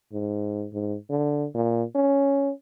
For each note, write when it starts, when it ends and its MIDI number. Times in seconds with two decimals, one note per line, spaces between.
0.12 0.67 44
0.73 0.96 44
1.10 1.46 50
1.54 1.83 46
1.95 2.51 61